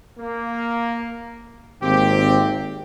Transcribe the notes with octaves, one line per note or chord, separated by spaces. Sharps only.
A#3
G#1 A#3 C4 G4